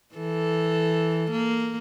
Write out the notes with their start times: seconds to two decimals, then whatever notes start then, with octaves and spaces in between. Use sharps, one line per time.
0.15 E3 A4
1.31 A#3